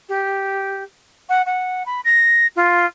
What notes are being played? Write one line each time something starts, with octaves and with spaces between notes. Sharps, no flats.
G4
F#5
F#5
B5
A#6
F4